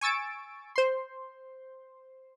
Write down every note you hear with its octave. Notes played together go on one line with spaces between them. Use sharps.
G#5 C#6 E6 A6 D7
C5 C6